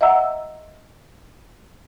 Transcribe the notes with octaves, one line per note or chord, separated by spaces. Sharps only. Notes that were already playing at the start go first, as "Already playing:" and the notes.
D#5 E5 F#5 A#5 E6